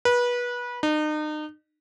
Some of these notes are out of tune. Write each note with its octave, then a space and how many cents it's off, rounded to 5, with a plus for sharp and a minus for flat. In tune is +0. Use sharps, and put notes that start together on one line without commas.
B4 -25
D#4 -35